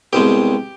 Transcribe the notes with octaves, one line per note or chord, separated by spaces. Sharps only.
C2 B2 G#3 G4